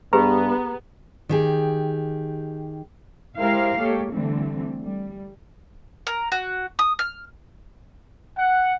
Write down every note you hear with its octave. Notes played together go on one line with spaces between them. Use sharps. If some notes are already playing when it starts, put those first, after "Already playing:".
G2 B3 G4 G#4 B4 A#5
D#3 G4 G#4
G#3 E4 G4 A#4 C5 F5
G#3 A#3 G4 A4 C#5
D3 E3 G3 A3 C4
G3
A#4
F#4
D#6
F6
F#5